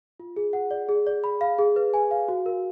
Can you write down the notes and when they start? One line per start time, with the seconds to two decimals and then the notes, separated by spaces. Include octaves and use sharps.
0.20 F4
0.36 G#4
0.53 F#5
0.71 D5
0.89 G#4
1.07 D5
1.24 B5
1.41 F5
1.58 G#4
1.76 B4
1.94 G#5
2.11 F5
2.28 F#4
2.46 A#4